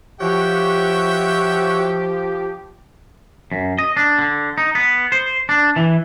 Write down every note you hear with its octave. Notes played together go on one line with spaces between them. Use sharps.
F3 F#4 G4 C#5 E5 G5
F#2
D#5
D4
D3
D#4
B3
C5
D4
E3